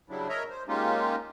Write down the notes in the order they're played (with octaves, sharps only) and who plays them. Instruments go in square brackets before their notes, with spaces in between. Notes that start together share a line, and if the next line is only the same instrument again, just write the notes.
[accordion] C#3 F#3 G3 D4 E4
A#4 C#5 D#5 E5 A#5
C5
G#3 A#3 C#4 D#4 F4 G4